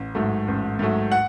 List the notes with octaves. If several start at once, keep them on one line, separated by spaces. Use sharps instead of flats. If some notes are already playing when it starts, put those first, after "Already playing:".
Already playing: A1
G#2 F#3 A3
A1
G#2 F#3 A3
F#5